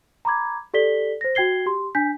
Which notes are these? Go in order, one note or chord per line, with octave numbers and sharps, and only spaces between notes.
A#5 B5 D6 G#6
G4 A4 D5 B6 G7
C5 A#6
F#4 G5 G#6 C7 G7
G4 C6
D4 G#5 G6 B6